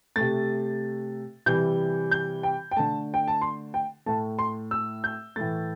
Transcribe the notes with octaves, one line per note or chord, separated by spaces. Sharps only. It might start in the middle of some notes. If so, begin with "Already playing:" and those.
C3 A3 A6
C3 E3 G3 G6
G6
G5
G5
D3 A3 A5
G5
A5
C6
G5
A2 A3 A5
C6
E6
G6
A2 E3 A3 A6